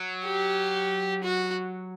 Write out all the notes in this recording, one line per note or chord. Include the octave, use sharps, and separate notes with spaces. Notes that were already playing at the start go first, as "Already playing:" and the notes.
Already playing: F#3
G4
F#4